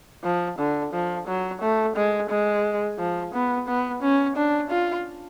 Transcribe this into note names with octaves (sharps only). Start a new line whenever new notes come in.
F3
D3
F3
F#3
A3
G#3
G#3
F3
B3
B3
C#4
D4
F4